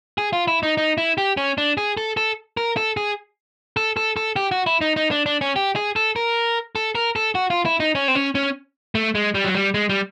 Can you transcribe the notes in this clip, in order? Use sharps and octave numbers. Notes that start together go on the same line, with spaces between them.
G#4
F4
E4
D#4
D#4
E4
G4
C#4
D4
G#4
A4
A4
A#4
A4
G#4
A4
A4
A4
G4
F#4
E4
D#4
D#4
D4
D4
C#4
G4
G#4
A4
A#4
A4
A#4
A4
F#4
F4
E4
D#4
C#4
C4
C#4
C#4
A3
G#3
G3
F#3
G3
G#3
G3